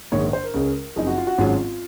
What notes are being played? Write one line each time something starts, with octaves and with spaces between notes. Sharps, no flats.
A#1 G#2 D#3 A#3 C#5
C5
A#4
C#2 C#3 G#3 C#4
F#1 F#2 F3 C4 D#4 G#4
F#4
F4
F#4
G#1 G#2 F#3 C#4 F4